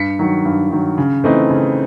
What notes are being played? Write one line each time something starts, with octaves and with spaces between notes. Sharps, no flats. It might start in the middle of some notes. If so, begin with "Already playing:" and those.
Already playing: G2 B6 C#7
D#3 F#3
G2
D#3 F#3
C#3
E3 A3 C4 D#4
C#3